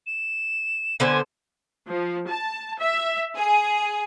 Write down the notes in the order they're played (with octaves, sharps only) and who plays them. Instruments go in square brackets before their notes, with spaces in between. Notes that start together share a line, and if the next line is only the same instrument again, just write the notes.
[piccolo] E7
[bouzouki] D3 B3 C5 [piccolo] G#5
[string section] F3
A5
E5
G#4